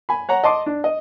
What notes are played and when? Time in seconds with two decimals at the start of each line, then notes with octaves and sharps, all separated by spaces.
0.09 G#5 B5
0.29 C#5 F#5 A#5
0.44 D#5 A5 C6 D6
0.66 D4
0.84 D#5